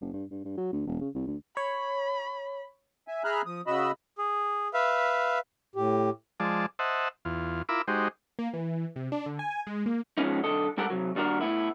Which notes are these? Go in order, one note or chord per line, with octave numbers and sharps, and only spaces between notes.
F#1
G2
G2
G2
F#3
D2
E1
C#3
C2
D2
C#5 B5
E5 G#5
G#4 E5 A#5 B5 F6 F#6
F3 D#6
C#3 F#4 D#5 B5 E6
G#4
B4 E5 F5
A2 G4
F3 G#3 D5 A5
C5 D#5 E5 F#5 A5
E2 F4
E4 F4 A#4 B5 D6 E6
G#3 D#4 F#4 G4 C5
A#3
E3
C3
D4
D3
G#5
G#3
A#3
G#2 F3 G#3 B3 C#4 D#4
B1 D3 A4 D#5
G#2 G3 G4 A4 A#4 F#5
C3 F#3
D#2 G3 D4 F#4 A#4
A2 B3 E4